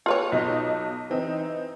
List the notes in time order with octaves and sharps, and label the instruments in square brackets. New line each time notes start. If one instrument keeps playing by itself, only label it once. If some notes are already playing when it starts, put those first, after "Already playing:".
[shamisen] F4 B4 C#5
[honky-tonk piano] B1 D#4 D#5
E3 C4 D#4